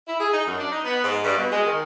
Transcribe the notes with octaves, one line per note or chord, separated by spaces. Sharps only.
E4
G#4
D#4
F#2
D4
D#4
B3
G#2
G2
B2
G#3
D#3